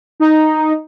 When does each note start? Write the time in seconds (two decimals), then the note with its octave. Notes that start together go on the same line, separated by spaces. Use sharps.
0.20 D#4